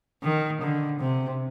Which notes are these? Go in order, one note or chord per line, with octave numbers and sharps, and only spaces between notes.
D#3
D3
C3